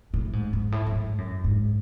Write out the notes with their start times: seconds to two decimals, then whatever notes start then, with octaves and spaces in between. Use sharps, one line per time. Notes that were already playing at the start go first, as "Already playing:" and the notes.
0.14 A2
0.33 G#2
0.53 G#2
0.72 A2
0.86 A2
0.92 G#2
1.18 F#2
1.44 G#2